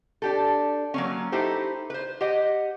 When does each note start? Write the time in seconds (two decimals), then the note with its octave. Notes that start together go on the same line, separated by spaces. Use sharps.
0.22 D4 G4 A4
0.94 F#3 A#3 C#4
1.32 D#4 E4 G4 A4 C5
1.90 B4 C5
2.21 G4 C5 D#5 F#5